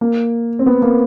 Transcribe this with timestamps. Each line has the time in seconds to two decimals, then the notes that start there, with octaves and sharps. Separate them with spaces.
0.01 A#3
0.59 C4
0.66 B3
0.82 A#3